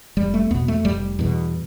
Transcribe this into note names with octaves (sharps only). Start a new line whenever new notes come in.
F1 G3
A3
E2 B2 B3
A3
F1 G3
E2 B2